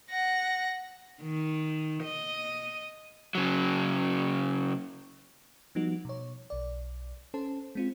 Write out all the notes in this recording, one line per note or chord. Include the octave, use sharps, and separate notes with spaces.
F#5 A#6
D#3
D#5
C#3 F#3
F3 G3 B3 D#4 F#4
B2 C#5
B1 D5
C#4 A4 C5 A5
G#3 C4 F4